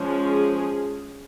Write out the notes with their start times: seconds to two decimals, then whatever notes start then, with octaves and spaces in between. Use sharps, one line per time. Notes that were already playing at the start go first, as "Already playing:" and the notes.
Already playing: F3 G#3 C#4
0.29 G#4